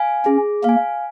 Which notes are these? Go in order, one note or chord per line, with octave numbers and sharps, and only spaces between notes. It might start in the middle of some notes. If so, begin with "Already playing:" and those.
Already playing: F5 G#5
C#4 G#4
A#3 F5 G#5